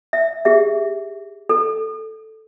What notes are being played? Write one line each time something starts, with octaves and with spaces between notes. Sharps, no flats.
E5
G4 G#4 E5
A4